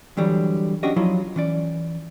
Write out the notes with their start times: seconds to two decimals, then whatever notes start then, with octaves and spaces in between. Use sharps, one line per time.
0.17 D3 E3 F#3 G3
0.83 C#4 D4 F#4 G4 D#5
0.96 F3 F#3 E4 F4
1.36 E3 C#4 D5